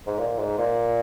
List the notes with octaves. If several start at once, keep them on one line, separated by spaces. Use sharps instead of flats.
G#2
A#2
G#2
A#2